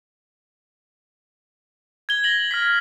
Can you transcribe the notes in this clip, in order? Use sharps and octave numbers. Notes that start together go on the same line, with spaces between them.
G#6 G7
A#6 F#7
F6 G#6 B6